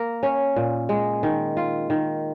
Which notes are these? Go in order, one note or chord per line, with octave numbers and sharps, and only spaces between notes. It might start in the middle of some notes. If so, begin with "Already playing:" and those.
Already playing: A#3 A#4
C#4
A#2
G#3
D#3
F4
D#3